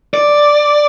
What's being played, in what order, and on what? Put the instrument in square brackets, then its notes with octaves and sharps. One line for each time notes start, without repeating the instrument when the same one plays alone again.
[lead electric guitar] D5